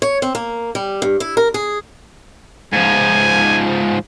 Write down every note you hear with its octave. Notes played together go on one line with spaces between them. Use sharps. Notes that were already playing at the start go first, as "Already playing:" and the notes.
C#5
C4
A#3
G3
G2
E4
A#4
G#4
G#2 F3 G#5